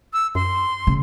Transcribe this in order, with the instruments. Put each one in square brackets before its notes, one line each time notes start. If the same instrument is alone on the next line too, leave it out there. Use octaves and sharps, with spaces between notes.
[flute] E6
[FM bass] F#2 [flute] C6
[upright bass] C#3